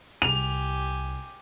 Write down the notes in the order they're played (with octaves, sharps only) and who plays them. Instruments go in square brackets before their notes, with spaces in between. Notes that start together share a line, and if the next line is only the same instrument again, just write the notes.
[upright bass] C2 [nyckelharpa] G4 G#5 [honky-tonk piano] F7